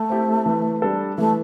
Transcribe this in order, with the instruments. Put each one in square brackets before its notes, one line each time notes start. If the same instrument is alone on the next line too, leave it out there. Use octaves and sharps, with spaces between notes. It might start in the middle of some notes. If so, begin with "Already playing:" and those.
Already playing: [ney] A3
[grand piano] C4 E4 G4
E3
G3 D4 A4
[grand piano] E3 [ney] A3